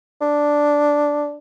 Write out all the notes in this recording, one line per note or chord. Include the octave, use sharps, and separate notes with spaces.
D4